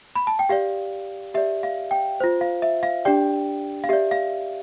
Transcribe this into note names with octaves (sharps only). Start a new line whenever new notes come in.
B5
A5
G5
G4 D5 F5
G4 D5 E5
F5
G5
F4 C5
F5
E5
F5
D4 G4 D5 G5
F5
G4 D5 E5
F5